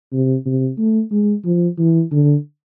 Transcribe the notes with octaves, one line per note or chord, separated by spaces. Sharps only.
C3
C3
A3
G#3
F3
E3
D3